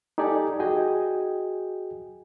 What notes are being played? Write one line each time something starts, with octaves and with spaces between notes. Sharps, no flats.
D#4 G4 A4 D5 G#5
F#4 G#4 D#5 G5 G#5